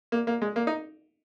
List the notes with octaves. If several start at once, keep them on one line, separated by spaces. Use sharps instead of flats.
A#3
A#3
G#3
A#3
D#4